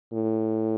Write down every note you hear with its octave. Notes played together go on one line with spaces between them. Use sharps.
A2